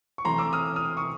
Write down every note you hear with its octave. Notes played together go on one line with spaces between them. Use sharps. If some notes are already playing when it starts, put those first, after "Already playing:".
C#6
C3 E3 A3 A#5 C6
D6 E6
D#6 F6
D#6 F6
C#6 D#6